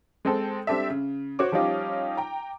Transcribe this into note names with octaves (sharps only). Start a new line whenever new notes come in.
G#3 C4 A4
G3 C4 D4 A4 E5
C#3
F#4 C5 C#5 D6
F3 G3 C#4 D#4 F4 G4
G5 A#5